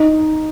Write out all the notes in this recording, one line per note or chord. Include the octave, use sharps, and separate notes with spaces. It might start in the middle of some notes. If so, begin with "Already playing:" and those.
Already playing: D#4